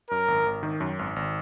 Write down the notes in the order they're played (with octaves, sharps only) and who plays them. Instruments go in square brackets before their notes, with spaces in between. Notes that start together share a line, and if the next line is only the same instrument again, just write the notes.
[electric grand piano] F#2 [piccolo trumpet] A#4
[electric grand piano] G#1
G#1
D#3
F#2
G#1
G#1